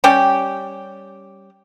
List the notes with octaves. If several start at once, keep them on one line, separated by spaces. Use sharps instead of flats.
G3 C#4 G4